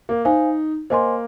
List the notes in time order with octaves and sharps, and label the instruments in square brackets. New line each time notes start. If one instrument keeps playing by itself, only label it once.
[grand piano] A#3
[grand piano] D#4 [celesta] C5 F5 G#5
[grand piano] A#3 [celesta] C5 D#5 G#5 C6